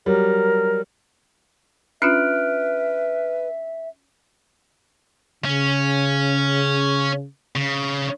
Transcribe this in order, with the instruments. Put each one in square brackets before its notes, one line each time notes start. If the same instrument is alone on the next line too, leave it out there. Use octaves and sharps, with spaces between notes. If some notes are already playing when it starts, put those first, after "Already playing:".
[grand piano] F#3 G3 [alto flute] A#4
[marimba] C#4 D4 F4 [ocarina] B4 [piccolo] E5 [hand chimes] F6 F#6 D7
[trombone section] C#3 [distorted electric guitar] C#4
[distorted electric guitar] C#3